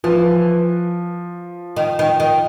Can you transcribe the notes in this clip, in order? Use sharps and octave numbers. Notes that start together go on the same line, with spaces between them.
E3 F3
D#3
D#3
D#3